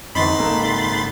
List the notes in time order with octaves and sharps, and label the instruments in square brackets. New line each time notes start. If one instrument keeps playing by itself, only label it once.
[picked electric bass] F2 D3 E3 [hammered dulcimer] D#4 F#4 [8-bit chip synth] B5 C6 A6
[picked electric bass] G#1 C#3 A#3 [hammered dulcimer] A4